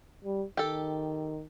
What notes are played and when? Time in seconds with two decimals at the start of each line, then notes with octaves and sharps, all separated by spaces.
0.24 G3
0.57 D#3 G4 A4